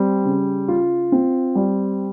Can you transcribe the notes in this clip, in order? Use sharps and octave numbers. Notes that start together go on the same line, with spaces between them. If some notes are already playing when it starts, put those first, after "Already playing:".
Already playing: G3 C4
C#3
F4
C4
G3